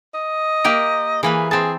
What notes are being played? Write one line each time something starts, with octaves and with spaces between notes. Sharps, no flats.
D#5
A#3 G4 A#4
E3 A#3 G#4 B4
C4 G#4 A5